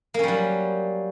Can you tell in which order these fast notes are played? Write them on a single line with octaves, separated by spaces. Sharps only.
A#3 C#4 G3 F#3